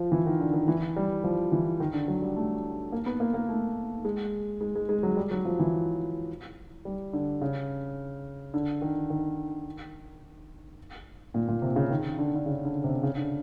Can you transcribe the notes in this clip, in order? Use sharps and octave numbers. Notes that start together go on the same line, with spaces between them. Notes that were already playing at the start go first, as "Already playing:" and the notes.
Already playing: F3
E3
D#3
D3
D#3
E3
G3
F3
E3
D#3
D3
F#3
G3
A3
A#3
B3
A#3
A#3
A3
G#3
G#3
G#3
G#3
F#3
G3
F#3
F3
E3
G3
D3
C#3
D3
D#3
D#3
A#2
A#2
C3
C#3
D#3
D3
D3
C#3
D3
C3
C#3
D3